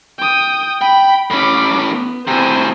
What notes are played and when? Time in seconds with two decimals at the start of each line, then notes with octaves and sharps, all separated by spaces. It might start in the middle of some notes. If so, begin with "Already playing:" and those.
0.18 G5 D#6
0.82 G5 B5
1.30 A2 C#4 B5 D6
1.89 B3
2.27 A2 C3 C5 G#5